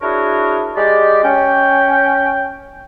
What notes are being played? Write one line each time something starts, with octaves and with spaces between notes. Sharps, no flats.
D4 E4 F#4 G#4 A#4 C#5
G#3 G4 D5
C#4 G5